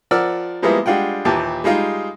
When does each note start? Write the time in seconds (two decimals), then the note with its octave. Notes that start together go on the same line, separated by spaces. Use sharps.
0.11 F3 A#4 D5 F#5 E6 F6
0.62 F3 G3 G#3 A#3 B3 E4
0.86 G3 G#3 D4 F4 F#5 G5
1.25 D#2 A#2 E3 E4 G4 A5
1.64 G3 G#3 D#4 F4